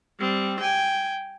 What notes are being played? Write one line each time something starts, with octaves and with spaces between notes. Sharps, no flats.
G3 C4
G5 G#5